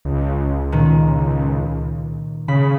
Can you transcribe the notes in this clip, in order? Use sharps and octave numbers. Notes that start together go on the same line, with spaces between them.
C#2
A#2 D#3
C#3 B5